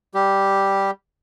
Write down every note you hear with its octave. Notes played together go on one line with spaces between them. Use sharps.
G3 G4